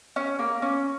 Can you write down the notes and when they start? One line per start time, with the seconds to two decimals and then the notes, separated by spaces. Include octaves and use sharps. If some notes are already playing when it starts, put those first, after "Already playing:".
0.16 C#4
0.39 A#3
0.62 C#4